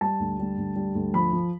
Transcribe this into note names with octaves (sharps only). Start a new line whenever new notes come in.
G3 A5
D2
G3
D2
G3
D2
F3 B5
F3